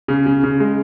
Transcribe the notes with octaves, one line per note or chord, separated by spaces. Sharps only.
C#3
C#3
C#3
G#3